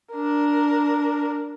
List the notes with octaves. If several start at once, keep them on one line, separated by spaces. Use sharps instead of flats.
D4 A#4